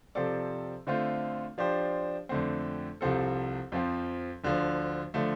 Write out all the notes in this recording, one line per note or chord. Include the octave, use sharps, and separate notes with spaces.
C3 F3 C4 A4 D5
D3 A3 C4 F4 C5
F3 D4 G4 C5
F2 D3 A3 C4
C2 C3 F3 C4 A4
F2 F3 C4
D2 D3 F3
D3 F3 A3